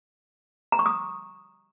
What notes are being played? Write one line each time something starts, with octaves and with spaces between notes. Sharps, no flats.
A#5
C#6
D#6